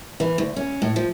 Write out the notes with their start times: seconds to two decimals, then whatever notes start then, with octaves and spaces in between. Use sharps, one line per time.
0.20 E3
0.38 D2
0.56 C#4
0.82 A2
0.96 F3